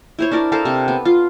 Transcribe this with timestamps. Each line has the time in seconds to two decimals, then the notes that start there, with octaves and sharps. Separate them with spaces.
0.19 E4 C5 C#5
0.31 D4 E4 A#4 D5
0.52 A4 A#4 C5 F5
0.65 C3
0.88 B3
1.05 F4